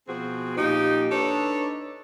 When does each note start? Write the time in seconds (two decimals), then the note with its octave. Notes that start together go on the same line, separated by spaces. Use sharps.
0.08 B2 F3 C4 F#4 G#4
0.57 A#2 F3 D#4 G4
1.11 D4 D#4 A4 B4 C#5